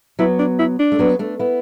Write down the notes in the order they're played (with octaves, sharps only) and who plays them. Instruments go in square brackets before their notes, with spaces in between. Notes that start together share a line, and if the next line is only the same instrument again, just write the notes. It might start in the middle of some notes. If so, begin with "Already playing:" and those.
[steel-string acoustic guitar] F#3 B3 [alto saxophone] E4
[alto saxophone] D4
E4
D4
[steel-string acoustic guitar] A3
F#3 B3
A3 D4
B3 E4